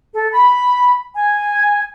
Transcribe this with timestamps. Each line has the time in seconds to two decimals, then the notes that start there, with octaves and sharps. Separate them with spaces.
0.14 A4
0.31 B5
1.15 G#5